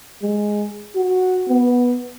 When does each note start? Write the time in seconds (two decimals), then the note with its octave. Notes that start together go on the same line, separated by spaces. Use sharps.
0.23 G#3
0.96 F#4
1.49 B3